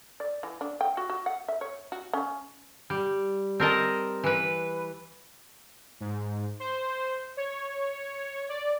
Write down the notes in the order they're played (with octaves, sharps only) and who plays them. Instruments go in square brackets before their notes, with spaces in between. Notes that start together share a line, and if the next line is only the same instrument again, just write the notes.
[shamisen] D5
E3
D4
G5
F#4
F#4
F#5
E5
C#5
F#4
C#4
[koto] G3
C4 A#4 D#5 A5
E3 B4
[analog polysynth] G#2
C5
C#5
D5